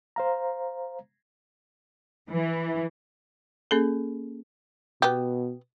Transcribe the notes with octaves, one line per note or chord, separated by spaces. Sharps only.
C5 F5 A#5
E3
A#3 C#4 G#4 A4
B2 B3 G4